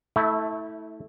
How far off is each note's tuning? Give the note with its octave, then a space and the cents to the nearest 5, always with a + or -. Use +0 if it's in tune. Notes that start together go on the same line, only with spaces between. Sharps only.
A3 +0 E4 -30